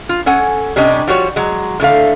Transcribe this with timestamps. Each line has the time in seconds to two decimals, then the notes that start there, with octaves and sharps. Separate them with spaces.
0.09 F4
0.26 C#4 A4 F#5 G#5
0.76 C3 G3 C#4 D4 D#5
1.07 F3 G3 F#4 C#5
1.36 F#3 G#3
1.80 A2 D3 A3 F5